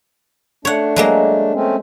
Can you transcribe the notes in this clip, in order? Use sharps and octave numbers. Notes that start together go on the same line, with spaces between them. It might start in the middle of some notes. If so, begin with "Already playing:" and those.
A3 D4 C#5 F#5
F#3 G#3 A#3
A3 C4 C#4